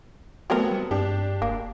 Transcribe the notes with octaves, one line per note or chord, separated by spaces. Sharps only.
F#3 A3 B3 C4 A#4
G3
G2 D4 G4
F1 A#3